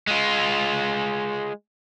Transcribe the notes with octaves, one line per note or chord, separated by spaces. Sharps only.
G#3 F4